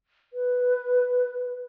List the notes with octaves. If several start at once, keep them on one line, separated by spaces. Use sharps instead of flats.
B4